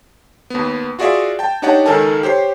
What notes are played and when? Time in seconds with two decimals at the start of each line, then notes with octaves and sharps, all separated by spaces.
0.50 D#2 B3
0.99 F4 F#4 G#4 D5 E5
1.39 G5 A5
1.62 D4 D#4 G4 C#5 F#5 A5
1.86 C#2 D#3 A4 A#4 G#5 A5
2.23 G4 C5 C#5 C7